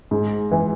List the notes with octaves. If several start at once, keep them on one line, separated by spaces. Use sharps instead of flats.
G#2
E3